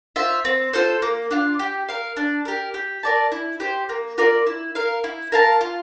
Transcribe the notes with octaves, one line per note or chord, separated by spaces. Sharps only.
F4 C5 E5
C4
F4 A4 C5
A#3
D4 F4
G4
A#4 F5
D4
G4 A#4
G4
A#4 D5 A5
E4
G4 C5
A#3
F4 A#4 D5
E4
A#4 F5
E4
A#4 F5 A5
F4